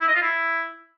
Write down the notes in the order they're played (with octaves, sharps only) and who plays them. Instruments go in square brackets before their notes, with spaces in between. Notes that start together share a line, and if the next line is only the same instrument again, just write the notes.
[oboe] E4
D#5
F4
E4